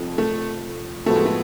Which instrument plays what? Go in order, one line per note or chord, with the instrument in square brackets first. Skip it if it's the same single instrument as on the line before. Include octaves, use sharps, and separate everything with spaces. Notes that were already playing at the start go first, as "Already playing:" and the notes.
Already playing: [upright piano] F1 F2 F3
[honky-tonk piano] A3
[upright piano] A2 F3 B3 F#4 A4 [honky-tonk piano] A3
[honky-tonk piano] G#3
A3